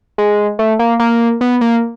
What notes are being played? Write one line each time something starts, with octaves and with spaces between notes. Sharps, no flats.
G#3
A3
A#3
A#3
B3
A#3